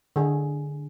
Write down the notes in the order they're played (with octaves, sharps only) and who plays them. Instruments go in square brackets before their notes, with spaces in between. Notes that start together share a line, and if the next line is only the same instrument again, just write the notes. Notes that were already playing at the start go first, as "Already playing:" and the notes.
[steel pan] D3 G#4